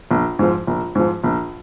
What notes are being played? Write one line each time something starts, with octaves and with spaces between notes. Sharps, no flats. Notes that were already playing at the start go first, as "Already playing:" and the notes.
A#1
G#2 F3
A#1
G#2 F3
A#1